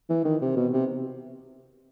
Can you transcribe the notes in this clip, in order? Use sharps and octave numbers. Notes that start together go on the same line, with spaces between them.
E3
D#3
C3
B2
C3